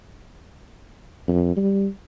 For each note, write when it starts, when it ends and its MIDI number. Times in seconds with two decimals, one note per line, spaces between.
1.28 1.55 41
1.57 1.87 55